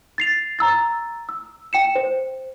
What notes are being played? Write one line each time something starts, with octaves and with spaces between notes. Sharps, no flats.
A6 C7 F7
A#5 E6 A6
E6
G5 C#7 E7
C5